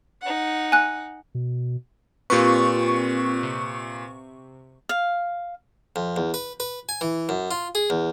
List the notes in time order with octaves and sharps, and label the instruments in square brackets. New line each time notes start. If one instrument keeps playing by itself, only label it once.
[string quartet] D#4 F#5
[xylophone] G#5 F#6
[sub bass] B2
[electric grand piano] A#2 B4 [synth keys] C4 F4 G4 [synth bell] C#6
[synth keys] C3
[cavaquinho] F5
[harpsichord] F2
E2
B4
B4
G#5
E3
F#2
F4
G#4
E2